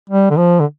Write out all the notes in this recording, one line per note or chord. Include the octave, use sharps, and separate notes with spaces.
G3
D3
F3
D3